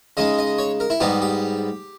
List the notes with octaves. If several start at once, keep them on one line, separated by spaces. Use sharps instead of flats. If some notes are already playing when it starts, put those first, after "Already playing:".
C#3 G#3 D#4 D#5
D#5
C#5
A#4
E4
G#2 G3 B3 D#4 G4
G4